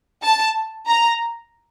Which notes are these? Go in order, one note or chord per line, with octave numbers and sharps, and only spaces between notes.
A5
A#5